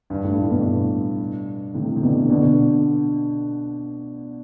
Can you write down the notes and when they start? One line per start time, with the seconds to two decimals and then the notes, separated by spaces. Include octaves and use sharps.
0.10 G2
0.24 A2
0.38 A2
0.50 G2 B2
1.74 A2 C3
1.96 C3
2.02 B2 D3
2.30 B2 D3